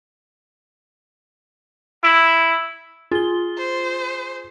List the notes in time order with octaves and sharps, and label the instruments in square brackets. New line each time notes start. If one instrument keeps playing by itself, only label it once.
[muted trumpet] E4
[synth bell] F4 G7 [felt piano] G#4
[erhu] C5